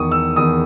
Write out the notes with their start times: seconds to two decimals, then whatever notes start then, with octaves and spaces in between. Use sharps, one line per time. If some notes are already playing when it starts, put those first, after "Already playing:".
Already playing: E2 D#3 C#6 D#6
0.11 E6
0.36 E2 D#3 D#6